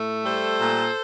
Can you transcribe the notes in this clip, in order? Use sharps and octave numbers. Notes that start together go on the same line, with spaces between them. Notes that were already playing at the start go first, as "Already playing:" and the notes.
Already playing: A2 A3
G3 A4 C5
A#2